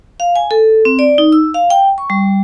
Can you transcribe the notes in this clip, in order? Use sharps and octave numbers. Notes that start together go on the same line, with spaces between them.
F5
G#5
A4
C4
D5
D#4
E6
F5
G5
C#6
G3